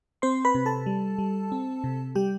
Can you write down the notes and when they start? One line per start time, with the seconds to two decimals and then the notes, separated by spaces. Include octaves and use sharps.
0.22 C4 C5 C6
0.45 B4 B5
0.55 C3
0.66 A4 A5
0.86 G3
1.18 G3
1.52 C4
1.84 C3
2.15 G3 G4 G5